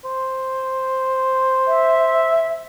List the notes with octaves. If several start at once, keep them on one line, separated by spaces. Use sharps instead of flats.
C5
E5